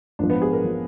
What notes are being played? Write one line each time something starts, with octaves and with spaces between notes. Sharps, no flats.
A#1 G#2 F3 D4
B3
G#4
A#4
F3